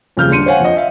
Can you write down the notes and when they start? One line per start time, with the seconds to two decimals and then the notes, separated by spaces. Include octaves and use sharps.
0.17 D#1 F2 C#3 G#4 F6 G6
0.30 D#1 D4 C6 C#7 D#7
0.46 C5 C#5 F5 F#5 G#5
0.60 F2 D#5
0.76 E5 F5